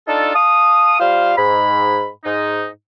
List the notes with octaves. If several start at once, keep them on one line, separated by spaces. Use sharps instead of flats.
D4 D#4 F4 A4
F5 A5 D#6
G3 F4 C5 F5
G#2 B5
G#2 D#4